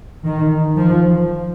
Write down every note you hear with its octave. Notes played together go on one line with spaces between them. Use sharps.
D#3
F3